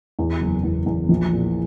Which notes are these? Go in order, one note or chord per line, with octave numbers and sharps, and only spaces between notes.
E2
F#1
E2
E2
A#1
A#2